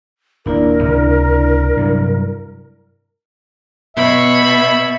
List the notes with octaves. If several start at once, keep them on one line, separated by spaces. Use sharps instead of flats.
D#1 A#3 D4 E4 A#4 D5
C#2 C3
G2 C3 F#3
B2 C#5 E5 B5